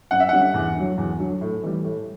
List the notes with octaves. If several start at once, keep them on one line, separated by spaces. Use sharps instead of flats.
F#2 F#5
E5
D3 G3 C#4 F#5
E2
D3 F#3
E2
D3 F#3
A2
E3 G3
A2